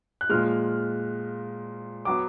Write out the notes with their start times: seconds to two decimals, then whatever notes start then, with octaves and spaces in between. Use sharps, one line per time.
0.21 F#6
0.29 A#2 F3 G#3 F6
2.05 F#3 B3 D6